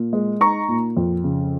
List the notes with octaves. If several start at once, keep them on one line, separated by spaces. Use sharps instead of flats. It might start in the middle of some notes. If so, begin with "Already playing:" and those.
Already playing: A#2
G#3
D#4 A#5 C#6
A#2
F2
C#3